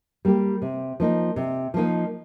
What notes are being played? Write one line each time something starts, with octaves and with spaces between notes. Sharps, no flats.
G3 A#3 G4
C3
F3 A#3 D#4
C3
F3 A#3 D#4